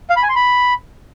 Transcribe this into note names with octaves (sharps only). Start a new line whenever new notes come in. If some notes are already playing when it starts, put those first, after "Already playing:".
F5
B5
G#5
C6
B5